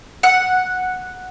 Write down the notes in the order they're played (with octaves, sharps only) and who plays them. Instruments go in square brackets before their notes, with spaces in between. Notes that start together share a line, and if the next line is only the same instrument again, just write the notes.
[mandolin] F#5